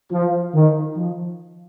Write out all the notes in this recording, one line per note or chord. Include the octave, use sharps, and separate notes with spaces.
F3
D#3
F3